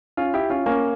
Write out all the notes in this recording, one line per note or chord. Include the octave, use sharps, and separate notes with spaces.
C#4 F4
E4 G4
C#4 F4
A#3 C#4